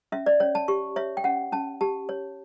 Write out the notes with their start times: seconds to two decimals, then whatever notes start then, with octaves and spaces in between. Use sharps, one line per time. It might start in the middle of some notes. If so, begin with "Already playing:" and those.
0.12 C#4 E5
0.26 D5
0.40 C#4 C#5
0.55 A5
0.68 G4 C#6
0.96 C#5 E5
1.17 G5
1.24 C#4 F#5
1.52 C#4 A5
1.81 G4 A5
2.09 C#5